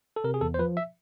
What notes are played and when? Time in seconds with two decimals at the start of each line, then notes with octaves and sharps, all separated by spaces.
0.16 A4
0.24 C3 A#4
0.34 G#4
0.41 E2 A4
0.54 C5
0.59 F3 B4
0.77 E5